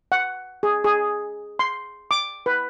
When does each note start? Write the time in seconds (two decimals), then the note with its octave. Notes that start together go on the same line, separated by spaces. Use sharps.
0.12 F#5
0.63 G#4
0.84 G#4
1.59 C6
2.11 D6
2.46 B4